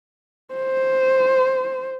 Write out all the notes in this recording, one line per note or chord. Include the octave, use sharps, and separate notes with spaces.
C5